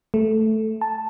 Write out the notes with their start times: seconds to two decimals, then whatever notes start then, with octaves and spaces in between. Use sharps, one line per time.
0.14 A3
0.81 A5